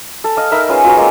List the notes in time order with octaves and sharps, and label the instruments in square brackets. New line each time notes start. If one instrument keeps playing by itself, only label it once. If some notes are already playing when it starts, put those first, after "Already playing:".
[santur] A4
D#5 F5
D#4 A#4 E5 B5
C#4 F4 G#4 B4
F4 F#4 B4 A#5
G#3 A#3 C4